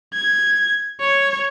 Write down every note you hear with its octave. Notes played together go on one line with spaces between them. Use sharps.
G#6
C#5